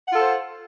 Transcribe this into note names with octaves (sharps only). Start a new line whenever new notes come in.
F4 A4 C5 F#5